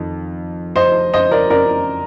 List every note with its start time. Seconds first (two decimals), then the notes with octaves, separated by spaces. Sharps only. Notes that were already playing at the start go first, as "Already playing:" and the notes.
Already playing: F2 D#3
0.76 C5 D#5
1.13 C5 D#5
1.31 A#4 D5
1.50 A#4 D5